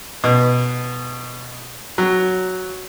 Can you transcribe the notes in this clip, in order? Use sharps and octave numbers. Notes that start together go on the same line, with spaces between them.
B2
F#3